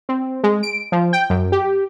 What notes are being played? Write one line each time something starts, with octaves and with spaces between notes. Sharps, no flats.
C4
G#3
D7
F3
G5
F#2
G4